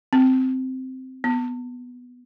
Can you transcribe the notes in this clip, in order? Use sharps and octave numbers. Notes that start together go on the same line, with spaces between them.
C4
B3